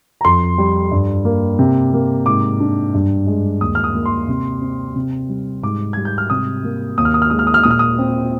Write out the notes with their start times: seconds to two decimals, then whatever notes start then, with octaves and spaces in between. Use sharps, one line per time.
0.21 A#5
0.24 F2 C6
0.58 G3
0.91 G2
1.25 A#3
1.59 C3
1.93 A#3
2.26 G#2 D6
2.60 D4
2.94 G2
3.27 G#3
3.61 D#2 D#6
3.75 F6
3.84 D#6
3.95 A#3
4.06 C6
4.29 C3
4.62 C4
4.96 C3
5.29 G3
5.63 G#2 D6
5.93 G3 G#6
6.05 G6
6.18 F6
6.30 C3 D#6
6.64 A#3
6.98 D#2 D#6
7.05 F6
7.14 D#6
7.22 F6
7.30 G#3 D#6
7.39 F6
7.47 D#6
7.54 F6
7.63 A#2 D#6
7.71 F6
7.79 D#6
7.99 C4